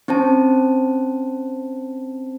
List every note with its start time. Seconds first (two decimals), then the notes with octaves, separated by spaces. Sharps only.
0.08 C4 C#4 C5 A5